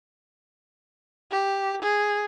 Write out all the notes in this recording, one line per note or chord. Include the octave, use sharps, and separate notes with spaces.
G4
G#4